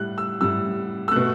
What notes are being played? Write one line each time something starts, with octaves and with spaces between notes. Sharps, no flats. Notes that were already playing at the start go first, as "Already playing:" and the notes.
Already playing: A2 G3 F#6
E6
A2 G3 E6
E6
B2 A3 F#6